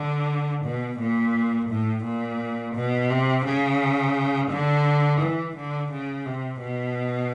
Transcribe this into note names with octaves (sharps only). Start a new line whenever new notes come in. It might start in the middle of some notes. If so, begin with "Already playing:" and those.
Already playing: D3
B2
A#2
A2
A#2
B2
C3
C#3
D3
E3
D3
C#3
C3
B2